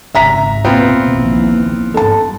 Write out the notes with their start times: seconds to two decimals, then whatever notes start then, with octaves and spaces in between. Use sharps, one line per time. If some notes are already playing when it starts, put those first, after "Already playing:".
0.15 G#1 C#2 G#2 E5 A#5 B6
0.64 A#2 B3 C4 F4
1.11 A#1 D#2 E3
1.94 G2 A4 A5